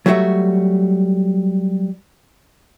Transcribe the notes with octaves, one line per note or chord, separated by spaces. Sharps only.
F#3 G3 A3 F#4 E5